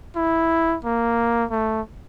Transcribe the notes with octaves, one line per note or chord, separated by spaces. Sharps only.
E4
A#3
A3